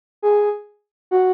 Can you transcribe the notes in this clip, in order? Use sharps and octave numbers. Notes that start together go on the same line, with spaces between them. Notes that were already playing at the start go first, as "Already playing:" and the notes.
G#4
F#4